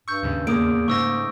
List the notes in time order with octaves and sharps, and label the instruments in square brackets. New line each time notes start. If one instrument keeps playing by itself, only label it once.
[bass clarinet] G2 [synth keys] C#6 [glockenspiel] E6 G6
[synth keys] D#2 G#2 C#3
[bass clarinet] E2 [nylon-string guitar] A#3 [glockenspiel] D6 D#6 D7
[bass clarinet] G#2 [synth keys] C#3 G#3 A3 [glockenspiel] C#6 E6 A#6